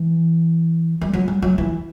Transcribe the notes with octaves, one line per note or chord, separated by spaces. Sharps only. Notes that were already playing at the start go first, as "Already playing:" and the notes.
Already playing: E3
G3
F#3
G3
F#3
E3